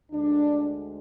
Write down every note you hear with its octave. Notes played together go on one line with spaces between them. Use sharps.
D2 D3 G#3 D4